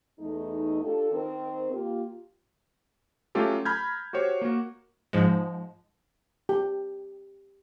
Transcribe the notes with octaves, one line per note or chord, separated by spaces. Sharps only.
E2 A3 D#4
D4 F4 G4 A4
D#3 C4 A#4
A#3 F4 G4
F#3 A3 C#4 F4 G4 A4
A#5 B5 F6 G6 G#6
F#4 G4 C5 C#5
A#3 F#4
G#2 F3 G#3
G4